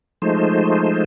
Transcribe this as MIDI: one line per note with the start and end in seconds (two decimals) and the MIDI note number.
0.22 1.04 53
0.22 1.04 56
0.22 1.04 57
0.22 1.04 63
0.22 1.04 72